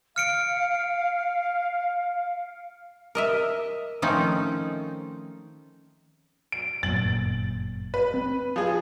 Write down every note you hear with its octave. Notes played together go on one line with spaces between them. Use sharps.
F5 F6 C#7 D7
A#4 D#5 E5
D#3 F3 A3 C4 C#4 D#4
D7
G1 F#2 A#2 A6 F#7
B4
C4
F3 G#4